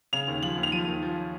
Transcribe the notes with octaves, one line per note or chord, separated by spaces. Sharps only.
C#3 F7
D#2
F3 F#7
D#2
F7
F3 D#7
D#2
F3